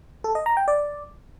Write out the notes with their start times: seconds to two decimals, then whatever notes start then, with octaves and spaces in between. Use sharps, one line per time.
0.24 A4
0.35 D#5
0.46 A#5
0.57 G5
0.68 D5